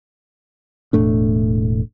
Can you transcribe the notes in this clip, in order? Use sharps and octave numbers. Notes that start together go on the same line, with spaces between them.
E1 A2 A3 D4